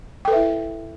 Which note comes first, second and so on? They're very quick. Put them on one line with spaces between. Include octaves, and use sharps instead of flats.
G5 A4 B4 E5 E4